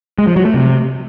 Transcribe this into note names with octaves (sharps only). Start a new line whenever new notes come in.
G#3
F3
F#3
A3
C3